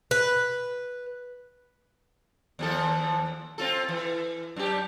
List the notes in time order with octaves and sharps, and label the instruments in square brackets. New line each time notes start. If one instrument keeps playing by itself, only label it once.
[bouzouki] B4
[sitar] D#2 F3 A4
C4 F4 A4
E3
F#2 G4